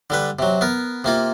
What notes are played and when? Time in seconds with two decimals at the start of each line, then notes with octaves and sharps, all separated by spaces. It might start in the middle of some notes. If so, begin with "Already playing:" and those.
0.10 D3 G3 B4
0.39 C3 F#3
0.61 B3 A#4
1.04 C3 A#3 F4